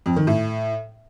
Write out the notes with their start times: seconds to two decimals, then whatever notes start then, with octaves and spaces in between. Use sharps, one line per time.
0.06 F2
0.16 D#3
0.27 A2